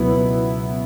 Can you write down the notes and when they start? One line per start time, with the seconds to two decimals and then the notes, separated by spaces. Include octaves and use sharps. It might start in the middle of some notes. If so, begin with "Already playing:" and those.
Already playing: C#2 B2 F#3 B3 E4